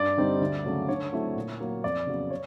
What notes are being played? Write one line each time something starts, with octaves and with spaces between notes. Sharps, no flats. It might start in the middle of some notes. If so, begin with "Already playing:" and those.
Already playing: G2 D5
D3 G3 C4 D#4
D2
C#3 F#3 A3
D3 C#5
F#3 A3 C4 E4
A#2
F#3 A#3
F2 D5
C#3 F#3 B3
C#5